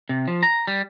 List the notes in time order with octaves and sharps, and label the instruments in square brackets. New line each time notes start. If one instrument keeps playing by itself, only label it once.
[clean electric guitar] C3
F3
A#5
G3